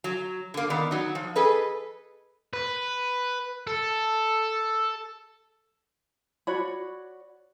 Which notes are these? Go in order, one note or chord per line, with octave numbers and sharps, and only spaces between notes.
F#3
D3 A#3
D#3 B3 D5
F#3 D#4
F3
G#4 A4 B4 D#5
B4
A4
F#4 C#5 D5 B5